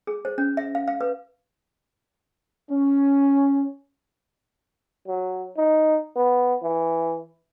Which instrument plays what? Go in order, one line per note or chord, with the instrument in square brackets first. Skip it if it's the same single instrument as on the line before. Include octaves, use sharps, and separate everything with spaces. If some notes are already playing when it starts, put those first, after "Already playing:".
[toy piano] G#4
C5
C#4
E5
F5
F5
B4
[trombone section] C#4
[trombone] F#3
D#4
B3
E3